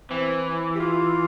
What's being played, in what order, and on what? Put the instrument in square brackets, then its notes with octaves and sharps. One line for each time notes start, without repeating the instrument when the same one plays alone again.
[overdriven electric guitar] E3 [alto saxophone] C4
[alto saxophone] G4
F4